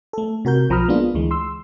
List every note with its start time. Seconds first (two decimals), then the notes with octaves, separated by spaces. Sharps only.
0.13 A3 A4
0.45 C3 F#4 A#4 G6
0.70 B1 F3 A#5 B5 D#6 F6
0.88 G#3 A#3 B3 D4 F4
1.15 D2 E3 G#3
1.31 C6 E6